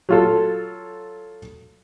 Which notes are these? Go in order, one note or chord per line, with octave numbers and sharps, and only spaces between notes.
F#3 F4 A4